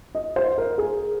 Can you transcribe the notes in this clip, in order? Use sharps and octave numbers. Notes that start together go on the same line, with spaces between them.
D#5
C5
A#4
G#4